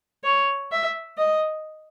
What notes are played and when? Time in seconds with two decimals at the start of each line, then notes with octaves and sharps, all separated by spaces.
0.24 C#5
0.72 E5
1.18 D#5